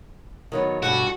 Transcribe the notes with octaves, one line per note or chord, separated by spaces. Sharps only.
D#3 F#3 B3
G2 B2 D3 F#4